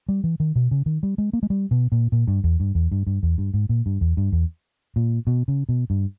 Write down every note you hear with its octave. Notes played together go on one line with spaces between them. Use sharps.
G3
E3
D#3
B2
C#3
D#3
G3
G#3
A#3
G#3
G3
B2
A#2
A#2
G2
E2
G2
E2
G2
G2
E2
G2
G#2
A#2
G2
E2
G2
E2
A#2
B2
C#3
B2
G2